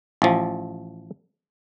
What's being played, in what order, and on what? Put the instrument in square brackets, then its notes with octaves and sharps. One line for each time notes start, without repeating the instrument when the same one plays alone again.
[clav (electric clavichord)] A1 F3